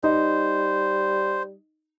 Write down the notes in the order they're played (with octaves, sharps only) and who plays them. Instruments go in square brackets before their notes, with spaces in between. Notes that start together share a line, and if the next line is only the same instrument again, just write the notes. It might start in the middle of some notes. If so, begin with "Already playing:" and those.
[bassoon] G3 [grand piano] D#4 [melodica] C5